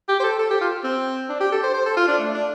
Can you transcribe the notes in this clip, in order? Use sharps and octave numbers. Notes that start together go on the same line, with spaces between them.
G4
C5
A4
A4
G4
F4
C4
D4
G4
A4
C5
C5
A4
F4
D4
A3
D4